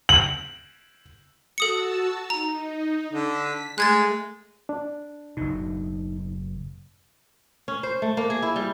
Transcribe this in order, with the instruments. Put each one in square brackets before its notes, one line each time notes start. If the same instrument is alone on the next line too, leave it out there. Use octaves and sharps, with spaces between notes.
[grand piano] F#7
[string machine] F#4 A5 E6 [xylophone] A4 D#6 C#7
[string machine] D#4 [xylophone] A#5
[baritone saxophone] D3 [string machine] B6
[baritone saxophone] G#3 [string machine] A3 [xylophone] F#6 G#6 A6
[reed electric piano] D4
[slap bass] F#1 B2 [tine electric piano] D#4
[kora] C#4
C5
A3
A#3
G#4
E4
G3